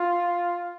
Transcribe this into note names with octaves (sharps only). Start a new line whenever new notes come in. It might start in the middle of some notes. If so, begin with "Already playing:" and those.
Already playing: F4